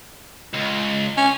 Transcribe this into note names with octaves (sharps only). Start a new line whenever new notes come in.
C#2
C#4